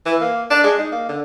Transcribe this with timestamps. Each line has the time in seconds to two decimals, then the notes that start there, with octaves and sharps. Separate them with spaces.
0.06 E3
0.21 A#3
0.50 D4
0.64 G#3
0.79 D#4
0.92 A#3
1.09 D3